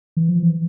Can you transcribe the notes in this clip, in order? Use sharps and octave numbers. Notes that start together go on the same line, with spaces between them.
E3
F3
E3